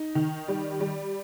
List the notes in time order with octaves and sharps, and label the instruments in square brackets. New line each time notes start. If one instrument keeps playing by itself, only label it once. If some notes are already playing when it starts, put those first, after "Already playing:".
Already playing: [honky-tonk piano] D#4
D#3
G3
G3